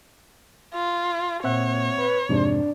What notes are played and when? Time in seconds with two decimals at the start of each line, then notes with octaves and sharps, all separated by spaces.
0.74 F4
1.44 A#2 C4 C#5 E5 F#5
1.98 B4
2.29 F2 G#2 C3 D4